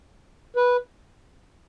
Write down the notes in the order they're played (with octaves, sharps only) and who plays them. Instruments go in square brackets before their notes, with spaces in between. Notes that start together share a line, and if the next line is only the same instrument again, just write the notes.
[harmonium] B4